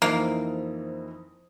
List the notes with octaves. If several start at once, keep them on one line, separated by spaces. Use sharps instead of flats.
F2 E3 A#3 D#4 C5